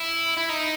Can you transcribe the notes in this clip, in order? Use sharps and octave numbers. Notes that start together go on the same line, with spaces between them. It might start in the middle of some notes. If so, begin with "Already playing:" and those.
Already playing: E4
E4
D#4